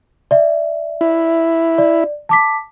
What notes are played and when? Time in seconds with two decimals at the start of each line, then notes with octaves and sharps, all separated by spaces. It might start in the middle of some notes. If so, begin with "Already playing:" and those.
0.31 D5 E5
1.01 E4
1.78 D5
2.29 A5 D6 B6